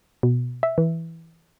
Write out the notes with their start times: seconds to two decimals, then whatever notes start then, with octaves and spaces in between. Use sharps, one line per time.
0.23 B2
0.63 E5
0.78 E3